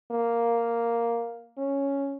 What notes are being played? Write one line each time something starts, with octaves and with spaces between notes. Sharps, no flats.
A#3
C#4